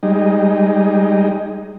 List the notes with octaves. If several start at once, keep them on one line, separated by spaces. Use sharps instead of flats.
G3 G#3 D#4